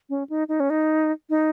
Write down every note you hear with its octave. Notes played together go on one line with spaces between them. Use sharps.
C#4
D#4
D#4
C#4
D#4
D#4